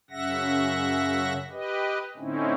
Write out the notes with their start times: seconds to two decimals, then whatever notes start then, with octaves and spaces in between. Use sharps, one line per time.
0.10 F#2 C#3 E5 F#5 A#6
1.51 G4 B4 D#5
2.16 A2 D3 C4 C#4 D#4 E4